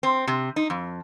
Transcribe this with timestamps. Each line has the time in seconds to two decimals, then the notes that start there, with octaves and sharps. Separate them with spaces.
0.03 C4
0.27 C3
0.56 D#4
0.70 F2